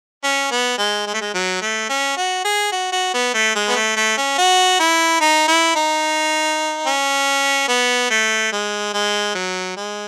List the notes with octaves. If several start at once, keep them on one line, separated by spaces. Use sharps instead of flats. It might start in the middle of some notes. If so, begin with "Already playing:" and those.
C#4
B3
G#3
G#3
A3
G#3
F#3
A3
C#4
F#4
G#4
F#4
F#4
B3
A3
G#3
B3
A3
A3
C#4
F#4
E4
D#4
E4
D#4
C#4
B3
A3
G#3
G#3
F#3
G#3